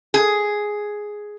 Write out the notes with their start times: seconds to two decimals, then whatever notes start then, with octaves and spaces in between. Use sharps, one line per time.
0.14 G#4